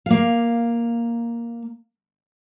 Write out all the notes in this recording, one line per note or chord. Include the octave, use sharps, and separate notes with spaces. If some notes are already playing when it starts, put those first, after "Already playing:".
A#3 F5